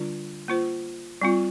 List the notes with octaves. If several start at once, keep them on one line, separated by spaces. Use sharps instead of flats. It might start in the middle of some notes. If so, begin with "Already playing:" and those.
Already playing: D3 G3 D4 F4
A#3 F4 C5
G3 C4 F4